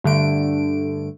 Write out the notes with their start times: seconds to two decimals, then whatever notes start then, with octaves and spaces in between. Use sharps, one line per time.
0.04 G2 D3 A3 D7